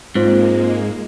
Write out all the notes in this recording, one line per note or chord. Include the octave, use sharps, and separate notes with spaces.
G#2 G#3 A#3 C4 F4 C5